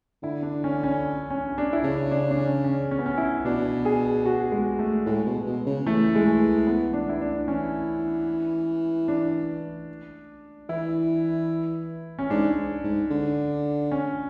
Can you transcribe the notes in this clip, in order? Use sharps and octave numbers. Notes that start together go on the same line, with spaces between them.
D3 E4
D4
C#4
C#4
C#4
D4
E4
C#3 D4
D4
D4
C#4
C#4
C#4
B3
C#4
E4
B2 D4
G#4
F#4
G#3
A3
A2 G#3
B2
B2
C#3
E3 A3
G#3
A3
B3
D4
E4
D4
E3 C#4
D4
E3 E4
C#4
G#2 D4
G#2
D3
C#4